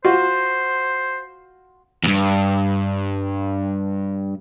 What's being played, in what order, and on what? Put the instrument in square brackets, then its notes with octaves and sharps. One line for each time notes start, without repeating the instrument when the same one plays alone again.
[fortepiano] F4 F#4 [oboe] C5
[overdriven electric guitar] E2 G2